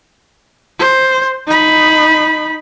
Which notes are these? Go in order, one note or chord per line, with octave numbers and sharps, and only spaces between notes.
C5
D#4 B5